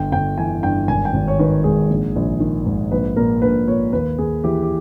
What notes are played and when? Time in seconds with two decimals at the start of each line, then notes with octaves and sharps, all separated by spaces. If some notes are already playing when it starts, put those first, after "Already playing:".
Already playing: G1 G5
0.12 G1 G5
0.38 E3 G#5
0.63 G2 G5
0.88 G#1 G#5
1.05 G5
1.13 G#1
1.28 C#5
1.39 D#3 B4
1.64 G#2 G#4
1.90 A#1
2.16 A#1
2.40 D#3
2.66 G#2
2.91 A#1 B4
3.16 A#2 A#4
3.42 A#1 B4
3.68 A#2 C#5
3.93 D#2 B4
4.18 D#2 G#4
4.44 E3 G4
4.62 G4